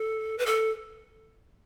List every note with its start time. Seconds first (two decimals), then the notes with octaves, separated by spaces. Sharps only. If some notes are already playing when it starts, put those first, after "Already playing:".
Already playing: A4
0.38 B4
0.46 A4